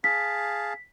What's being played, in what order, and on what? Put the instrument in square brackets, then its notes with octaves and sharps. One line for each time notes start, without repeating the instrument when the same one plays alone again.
[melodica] G#4 F5 A5 [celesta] B6